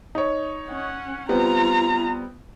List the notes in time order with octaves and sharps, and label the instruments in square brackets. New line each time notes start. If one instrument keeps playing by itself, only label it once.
[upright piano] D#4 C#5
[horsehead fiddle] C#4 F#5
[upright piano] G3 B3 C4 [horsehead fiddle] F4 A#5